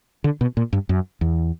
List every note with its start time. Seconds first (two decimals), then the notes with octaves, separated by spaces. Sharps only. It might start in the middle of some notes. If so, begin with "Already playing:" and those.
0.24 D3
0.41 B2
0.57 A#2
0.73 G2
0.89 F#2
1.21 E2